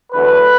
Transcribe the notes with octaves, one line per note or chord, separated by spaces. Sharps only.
E2 D3 F#3 A3 B4